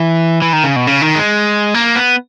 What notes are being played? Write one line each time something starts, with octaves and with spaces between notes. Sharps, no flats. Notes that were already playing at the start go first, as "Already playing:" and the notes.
Already playing: E3
E3
D#3
C#3
B2
C#3
D#3
G#3
A#3
B3